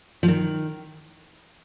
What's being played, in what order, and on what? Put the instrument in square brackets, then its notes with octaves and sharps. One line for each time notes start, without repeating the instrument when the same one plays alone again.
[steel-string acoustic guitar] F3
D#3